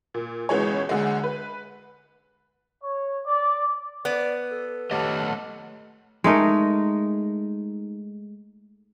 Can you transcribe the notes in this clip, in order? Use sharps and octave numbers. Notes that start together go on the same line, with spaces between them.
A#2
C#2 B2 E3 G#3 C#5
D2 D3 G#3
B4
C#5
D5
B3 D5
A4
A3 G4 A4 C#5 D#5 F#5
G#3 A3 D#4 A#4